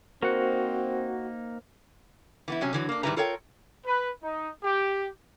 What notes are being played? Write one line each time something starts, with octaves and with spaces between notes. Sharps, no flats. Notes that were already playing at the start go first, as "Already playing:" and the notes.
A#3 C4 D#4 F#4 A#4 C5 F#5
E3 B3 E4
C3 F#3 C#4
D3 E3 F#3
A#3 D4
G#2 D#3 G3 E4 B4 A#5
F4 A4 A#4 C#5 E5 G5
B4
D#4
G4